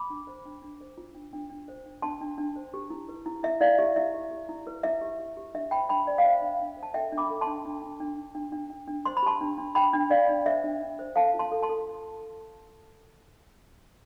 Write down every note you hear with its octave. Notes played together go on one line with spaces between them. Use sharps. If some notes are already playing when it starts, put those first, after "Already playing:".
Already playing: B5 D6
D4
C5
D4
D4
C5
F4
D4
D4
D4
C5
D4
D4 A5 C6
D4
D4
C5
G4
E4
B4
E4
E4 E5
E4 D5 F5
G4 E5
E4 E5
G4
G4
E4
B4
E4 E5
G4
G4
G4
D4 E5
C5 G5 B5
D4 G5 B5
C5 D5
F5
C5 E5
D4
D4
C5
A5
A4 E5 G5
D4
B5 D6
A4
A5 C6
D4
D4
D4
D4
D4
D4
D4
D4
D4
C5 C6
B5
G4 A5 C6
D4
D4
D4 G5 B5
D4
D4 D5 F5
D4
C5 E5
D4
D4
C5
A4 F5 A5
F4
A5 C6
A4
A5 C6
A4